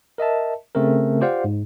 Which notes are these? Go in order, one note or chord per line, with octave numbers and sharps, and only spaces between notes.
A#4 D#5 E5 A5
C#3 A3 C4 A#4
F4 G4 C5 D5 F5 F#5
G#2